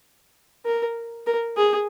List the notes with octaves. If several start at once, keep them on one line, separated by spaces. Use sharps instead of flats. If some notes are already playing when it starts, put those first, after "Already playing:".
A#4
A#4
G#4